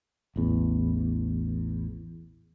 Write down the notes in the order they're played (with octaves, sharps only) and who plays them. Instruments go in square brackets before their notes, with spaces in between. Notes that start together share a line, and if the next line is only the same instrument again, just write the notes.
[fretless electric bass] A1 E2